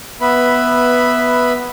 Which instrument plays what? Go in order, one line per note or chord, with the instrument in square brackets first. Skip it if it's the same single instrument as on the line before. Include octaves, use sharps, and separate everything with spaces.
[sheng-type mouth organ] B3 B4 E5 B5